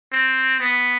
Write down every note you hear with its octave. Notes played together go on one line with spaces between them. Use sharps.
C4
B3